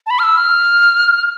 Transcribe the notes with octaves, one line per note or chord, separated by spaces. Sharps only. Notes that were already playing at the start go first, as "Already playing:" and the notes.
A5
B5
F6
E6
F6